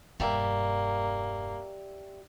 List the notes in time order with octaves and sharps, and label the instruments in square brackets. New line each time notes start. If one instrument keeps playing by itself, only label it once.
[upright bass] E1 G2 [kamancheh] A#3 [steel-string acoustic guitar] G4 D5 E5